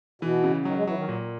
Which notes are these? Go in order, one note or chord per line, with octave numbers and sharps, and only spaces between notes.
B2 E3
C#3
D#3 F#3
G#3
E3 F#3
D#3
A#2